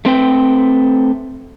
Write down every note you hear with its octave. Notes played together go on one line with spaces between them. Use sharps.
A3 C4 B4 G5